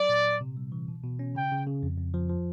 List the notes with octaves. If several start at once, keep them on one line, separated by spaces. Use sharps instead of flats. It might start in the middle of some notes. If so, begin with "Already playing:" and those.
Already playing: F#3 D5
A#2
A#2
C3
G3
E3
B2
B2
C#4
C#3 G5
C#3
C#3
F2
F2
F3
F3